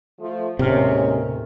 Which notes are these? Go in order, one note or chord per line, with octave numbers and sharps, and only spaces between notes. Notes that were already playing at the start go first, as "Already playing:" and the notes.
F3 A3
D#2 A2 C3 G#3 A#3 C#4 F6